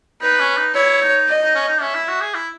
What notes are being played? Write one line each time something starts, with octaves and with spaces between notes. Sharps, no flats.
D#4 B4
C#4
D#4
E4 C#5
D#4
D#5
D#4
C#4
D#4
C#4 E5
E4
F#4
G#4
E4